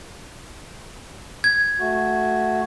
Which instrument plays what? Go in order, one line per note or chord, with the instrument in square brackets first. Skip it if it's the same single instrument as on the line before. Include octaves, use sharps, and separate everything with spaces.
[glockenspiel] G#6
[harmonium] A3 F#4